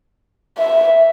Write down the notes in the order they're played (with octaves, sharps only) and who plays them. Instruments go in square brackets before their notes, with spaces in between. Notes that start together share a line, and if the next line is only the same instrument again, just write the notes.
[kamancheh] E5